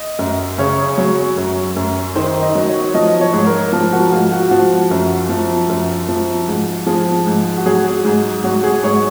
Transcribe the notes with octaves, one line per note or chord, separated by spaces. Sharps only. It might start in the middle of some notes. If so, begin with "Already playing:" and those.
Already playing: D#5
F#2
C#3 C#5
F#3
F#2
F#2
D#3 C5
D#5
F#3
C#5
F3 D#5
C#5
G#2
A#4
F3 A#4
F#4
G#2 F4
F#4
F3 F#4
F#2
F3
F#2
F3
G#2
F3 G#4
G#2
F#4
F#3 G#4
G#2
F#3 F#4
G#4
G#2 C#5